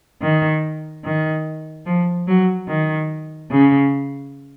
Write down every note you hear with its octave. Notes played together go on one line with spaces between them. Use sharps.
D#3
D#3
F3
F#3
D#3
C#3